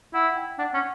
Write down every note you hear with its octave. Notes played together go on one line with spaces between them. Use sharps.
E4 F#5
G5
D4 F#5
C#4